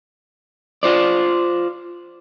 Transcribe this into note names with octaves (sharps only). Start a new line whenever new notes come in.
F4 C5 D5